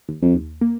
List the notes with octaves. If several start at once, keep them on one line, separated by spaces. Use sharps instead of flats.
D#2
F2
D#2
A#3